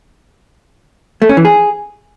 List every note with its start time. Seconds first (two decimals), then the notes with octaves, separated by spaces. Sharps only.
1.22 A3
1.29 C#4
1.37 E3
1.45 G#4